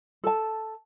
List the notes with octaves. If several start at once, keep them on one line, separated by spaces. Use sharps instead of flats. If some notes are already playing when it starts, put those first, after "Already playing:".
A4 A5